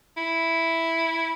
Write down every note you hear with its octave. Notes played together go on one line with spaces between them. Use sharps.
E4